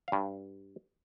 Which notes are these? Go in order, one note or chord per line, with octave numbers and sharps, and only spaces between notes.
G2 F5